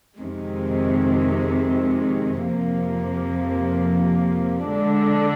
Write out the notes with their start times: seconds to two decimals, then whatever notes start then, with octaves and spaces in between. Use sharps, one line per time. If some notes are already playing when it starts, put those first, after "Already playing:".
0.17 F2 C3 D#3 G#3
2.45 F2 C3 F3 A#3
4.71 D3 G#3 D4